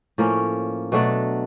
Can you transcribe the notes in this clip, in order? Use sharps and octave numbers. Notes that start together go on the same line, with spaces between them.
A2 F3 A#3 C#4
B2 F#3 A3 D4